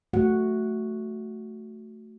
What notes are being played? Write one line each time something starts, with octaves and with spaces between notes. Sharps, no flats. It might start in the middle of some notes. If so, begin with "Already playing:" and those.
A3 F#4 F#5